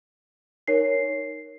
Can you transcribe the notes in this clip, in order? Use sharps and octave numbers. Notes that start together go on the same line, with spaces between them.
D#4 A#4 C#5 C7